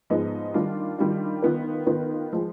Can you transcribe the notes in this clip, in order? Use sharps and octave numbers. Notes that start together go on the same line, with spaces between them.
G#2 F3 G#3 B3 D#4
D#3 G3 D4 F4
D#3 G3 D4 F4
D#3 B3 F4 B4
D#3 B3 F4 B4
F3 G#3